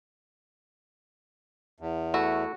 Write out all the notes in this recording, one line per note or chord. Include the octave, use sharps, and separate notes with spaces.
E2
A3 E4 F#4